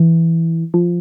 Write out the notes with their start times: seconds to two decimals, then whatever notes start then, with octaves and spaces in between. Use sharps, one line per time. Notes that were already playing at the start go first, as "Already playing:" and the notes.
Already playing: E3
0.74 F3